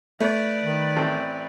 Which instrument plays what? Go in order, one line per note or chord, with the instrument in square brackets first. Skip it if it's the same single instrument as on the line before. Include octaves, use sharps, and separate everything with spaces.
[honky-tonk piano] A3 [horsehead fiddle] B4 D5
[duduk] D#3
[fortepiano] A1 C4 A4